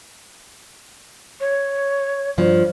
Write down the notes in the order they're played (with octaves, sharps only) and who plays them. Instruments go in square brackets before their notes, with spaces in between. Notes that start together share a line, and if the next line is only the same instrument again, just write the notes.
[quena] C#5
[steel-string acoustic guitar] G2 F3